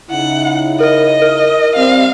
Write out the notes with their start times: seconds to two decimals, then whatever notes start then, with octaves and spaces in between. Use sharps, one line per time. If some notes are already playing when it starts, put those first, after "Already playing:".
0.10 C#3 D#4 E4 F#5
0.80 A#4 D#5
1.22 A#4
1.76 G3 C4 F5